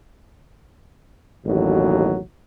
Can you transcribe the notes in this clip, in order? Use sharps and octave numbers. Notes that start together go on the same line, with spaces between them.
A1 D#2 B2 F#3